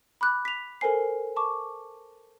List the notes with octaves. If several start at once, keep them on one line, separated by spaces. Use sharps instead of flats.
B5 D6 F#6
B6 F7
A4 A#4 C5 G#5 C7
A5 C#6 D6